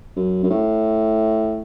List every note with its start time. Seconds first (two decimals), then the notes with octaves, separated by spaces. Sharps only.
0.16 F#2
0.43 F#2
0.50 A2